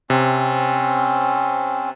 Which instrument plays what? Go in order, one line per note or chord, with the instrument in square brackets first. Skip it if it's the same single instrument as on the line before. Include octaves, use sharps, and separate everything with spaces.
[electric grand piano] C3 [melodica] C4 C#4